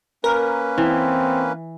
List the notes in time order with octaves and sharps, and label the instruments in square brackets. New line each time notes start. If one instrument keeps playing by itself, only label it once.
[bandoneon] A#3 C#4 B4 [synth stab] A#4
[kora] E3 [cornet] C4